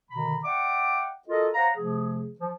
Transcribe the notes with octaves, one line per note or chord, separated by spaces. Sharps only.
B2 D3 D#3 A#5 B5
D5 E5 F#5 G5 D6
F4 F#4 A4 A#4 D#5
C5 C#5 F5 F#5 A#5
C3 F3 A3 G#4
F3